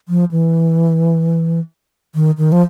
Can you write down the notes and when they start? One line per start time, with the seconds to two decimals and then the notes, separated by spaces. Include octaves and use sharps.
0.09 F3
0.31 E3
2.15 D#3
2.38 D#3
2.52 F3